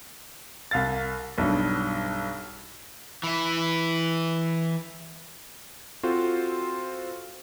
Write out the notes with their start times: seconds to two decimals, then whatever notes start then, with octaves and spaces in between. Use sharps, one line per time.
0.71 C2 F5 A6
1.38 B1 G2
3.23 E3 E4
6.03 C4 F4 F#4 A4 C5